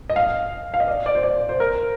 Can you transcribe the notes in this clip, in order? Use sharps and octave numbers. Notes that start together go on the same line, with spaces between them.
D#5
F5
F5
D#5
D5
D5
C5
D5
C5
A#4